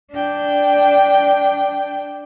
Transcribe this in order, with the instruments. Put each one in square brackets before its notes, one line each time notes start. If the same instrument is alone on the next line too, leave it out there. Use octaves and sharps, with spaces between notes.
[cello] D4 G5